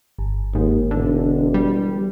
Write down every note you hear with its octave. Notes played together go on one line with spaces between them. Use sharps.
G1
D#2 G#2
E1 D3
G3